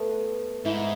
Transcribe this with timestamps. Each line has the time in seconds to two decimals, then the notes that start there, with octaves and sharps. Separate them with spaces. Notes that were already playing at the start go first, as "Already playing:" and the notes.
Already playing: A3 B3
0.65 G#2 E4